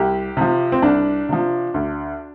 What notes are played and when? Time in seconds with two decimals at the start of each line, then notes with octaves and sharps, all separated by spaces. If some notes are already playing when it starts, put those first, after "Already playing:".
Already playing: C2 G4
0.37 C3 F3
0.72 C4
0.82 C2 D4
1.29 C3 F3
1.74 D2